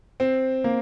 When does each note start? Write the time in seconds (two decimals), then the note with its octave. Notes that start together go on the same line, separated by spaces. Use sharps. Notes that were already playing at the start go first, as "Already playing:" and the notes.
0.20 C4
0.64 A#3